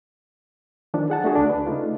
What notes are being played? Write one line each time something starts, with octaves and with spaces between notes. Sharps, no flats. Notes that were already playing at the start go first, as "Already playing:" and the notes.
D#3 F3 D4
G#4 F#5 A5
A3 D4 F#4 G#4
D2 D4
B4
C#3 A3 D#4 F4